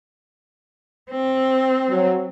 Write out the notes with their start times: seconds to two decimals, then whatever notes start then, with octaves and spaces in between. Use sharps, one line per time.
1.10 C4
1.90 F#3